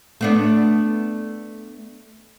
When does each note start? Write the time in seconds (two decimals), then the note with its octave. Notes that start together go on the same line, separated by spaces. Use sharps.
0.21 A3 B3 D4